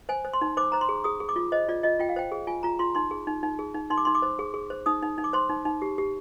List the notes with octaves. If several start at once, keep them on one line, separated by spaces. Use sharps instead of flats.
C5 G#5
C5
C6
D#4
C5 D6
C5 A#5
C6
G#4
G#4 D#6
G#4
D6
F4
C5 D#5
F4 D5
F4 D#5
F4 G5
F5
C5 G5
G#4
F4 G#5
F4 A#5
F4 C6
D#4 C6
G#4
D#4
D#4
G#4
D#4
D#4 C6
D6
D#4 C6
D6
C5
G#4
G#4
C5
D#4 D#6
D#4
D#4
D6
C5 C6
D#4
D#4
G4
G4